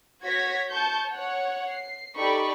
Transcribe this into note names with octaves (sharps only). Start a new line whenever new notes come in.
F#4 C#5 G#6 A#6 B6
A5 C#6 G6
C#5 F#5
C7
D#4 G4 A4 D5 B5 C#6